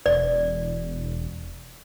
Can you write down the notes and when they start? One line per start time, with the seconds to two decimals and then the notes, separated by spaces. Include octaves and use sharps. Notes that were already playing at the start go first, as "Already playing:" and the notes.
0.06 E1 D5